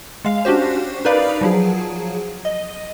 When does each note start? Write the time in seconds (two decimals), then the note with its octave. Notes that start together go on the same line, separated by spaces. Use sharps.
0.25 G#3 F5
0.45 C#4 D4 F#4 G4 C5
1.05 D#4 A#4 B4 D5 F5 B5
1.41 F3 F#3 G#4
2.45 D#5